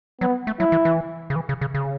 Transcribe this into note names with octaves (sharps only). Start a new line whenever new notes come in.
F#3 B3
A3
F#3 E4
E3
E3
C#3
E3
C#3
C#3
C#3